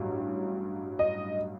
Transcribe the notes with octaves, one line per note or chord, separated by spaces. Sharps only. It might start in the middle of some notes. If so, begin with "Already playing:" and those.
Already playing: A1 G2 F#3
D#5